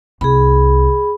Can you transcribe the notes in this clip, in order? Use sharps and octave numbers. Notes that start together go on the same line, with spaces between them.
C2 G#4 B5